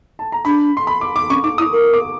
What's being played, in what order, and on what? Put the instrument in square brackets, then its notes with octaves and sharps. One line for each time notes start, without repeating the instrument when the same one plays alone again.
[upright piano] A5
A#5
[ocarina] D4 [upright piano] B5
[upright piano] C6
B5
D6
D6
[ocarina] C#4 [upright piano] C#6
[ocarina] D#4 [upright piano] D6
[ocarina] E4 [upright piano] D#6
[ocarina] A#4
[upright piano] D6